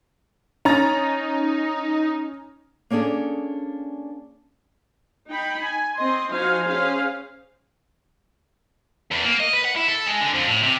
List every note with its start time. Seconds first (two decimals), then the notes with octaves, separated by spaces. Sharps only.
0.65 C#4 D#4 A#5 A6
2.90 A#3 C#4 D4 G#4 A4
5.27 D#4 G5 B5
5.62 G#5
5.97 C4 D#5 C6
6.30 F3 D#4 F#4 C5 F5 G#5
6.67 C#4 G#4 C5 F5
9.11 E2
9.24 A#3
9.40 D#5
9.53 B4
9.65 F#5
9.76 E4
9.88 A4
10.06 G#3
10.20 D3
10.34 F2
10.48 A2
10.63 C3